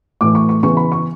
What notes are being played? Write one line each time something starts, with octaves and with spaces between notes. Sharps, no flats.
A2 E3 A3 D6
C#6
C#6
C#3 E3 B3 C#6
B5
C#6